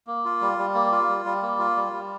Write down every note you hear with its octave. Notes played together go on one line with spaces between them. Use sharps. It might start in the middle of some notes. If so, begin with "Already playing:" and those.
A#3
F4
G3
G3
A#3
F4
G3
G3
A#3
F4
G3
G3